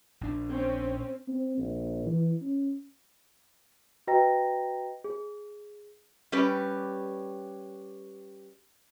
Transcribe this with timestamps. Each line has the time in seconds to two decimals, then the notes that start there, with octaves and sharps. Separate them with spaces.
0.21 A#1 D4
0.50 C4 C#4
1.28 C4
1.58 A#1
2.06 E3
2.42 C#4
4.07 F#4 B4 D#5 G5 A#5 A#6
5.04 G#4
6.32 G3 C#4 G4 B4